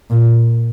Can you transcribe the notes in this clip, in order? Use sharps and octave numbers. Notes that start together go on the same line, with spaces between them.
A#2